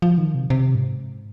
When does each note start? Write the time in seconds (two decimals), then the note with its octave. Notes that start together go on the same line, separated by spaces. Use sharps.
0.02 F3
0.18 D#3
0.35 C3
0.50 C3
0.75 G#2